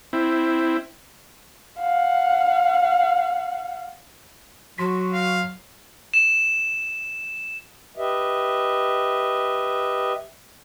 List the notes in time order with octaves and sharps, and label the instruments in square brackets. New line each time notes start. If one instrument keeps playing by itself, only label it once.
[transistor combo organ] C4 E4
[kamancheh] F5 F#5
[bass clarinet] F#3 [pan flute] F#4 [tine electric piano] C6 B6
[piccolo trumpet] F5
[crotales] E7
[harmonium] G4 B4 D#5 E5